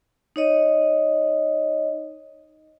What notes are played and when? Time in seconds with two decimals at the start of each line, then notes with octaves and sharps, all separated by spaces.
0.36 D#4 C#5 D#5